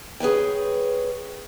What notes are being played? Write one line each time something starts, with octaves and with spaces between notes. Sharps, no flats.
G#4 B4 C#5 G5